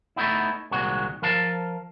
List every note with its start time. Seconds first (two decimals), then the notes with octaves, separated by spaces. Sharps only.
0.16 A3 B3 D#4 E4
0.71 C2 A#2 D#3 G#3 F#4
1.22 F3 A#4 F5 A5